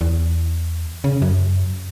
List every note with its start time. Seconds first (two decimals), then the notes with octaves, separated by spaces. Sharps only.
0.01 E2
1.04 C#3
1.22 F#2